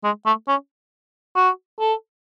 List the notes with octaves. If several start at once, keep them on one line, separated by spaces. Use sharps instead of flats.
G#3
A3
C#4
F#4
A4